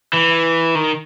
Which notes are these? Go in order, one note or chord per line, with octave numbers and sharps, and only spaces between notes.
E3
D#3